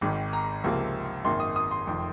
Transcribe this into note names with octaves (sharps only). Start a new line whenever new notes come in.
G#1 G#2 D#3
A#5
C#2 C3 F3 A#3
G#1 F#2 D#3 A#3 C6
D#6
D#6
C6
F1 F2 D#3